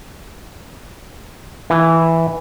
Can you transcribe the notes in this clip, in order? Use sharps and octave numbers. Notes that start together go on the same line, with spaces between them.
E3